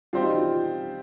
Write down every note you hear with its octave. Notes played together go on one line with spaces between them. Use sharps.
G3 C4 F4 G4 C5
D#4
F4